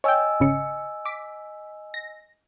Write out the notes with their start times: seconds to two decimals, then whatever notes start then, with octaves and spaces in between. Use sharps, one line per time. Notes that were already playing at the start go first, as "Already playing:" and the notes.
0.04 C#5 D#5 G5 G#5 E6
0.40 G#1 C#3 C#7
1.05 D6 B6
1.94 A#6